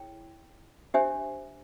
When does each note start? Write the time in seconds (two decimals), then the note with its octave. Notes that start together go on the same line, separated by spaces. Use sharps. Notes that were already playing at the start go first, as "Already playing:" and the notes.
Already playing: E4 G#4 C#5 G5
0.94 D4 G4 C5 E5 G#5